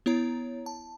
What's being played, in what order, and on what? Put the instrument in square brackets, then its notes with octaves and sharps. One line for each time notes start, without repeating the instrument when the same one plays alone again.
[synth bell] B3 E4 C#5 A#5
A5